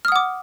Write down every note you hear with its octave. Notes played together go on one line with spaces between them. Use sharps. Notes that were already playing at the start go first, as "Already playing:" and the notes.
F#5 D6 D#6 F6